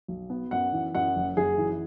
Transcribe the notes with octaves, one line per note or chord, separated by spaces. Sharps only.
B1
B3
F#2 F#5
E3
F#2 F#5
F#1
F#1 G#4
E3